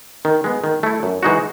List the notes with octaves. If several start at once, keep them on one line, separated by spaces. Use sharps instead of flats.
D#3
G#3 B3
D#3
A3 E4
F#2
E3 G#3 D#4 F#4